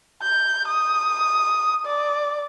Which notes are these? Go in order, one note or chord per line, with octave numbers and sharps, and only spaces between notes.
G6
D#6
D5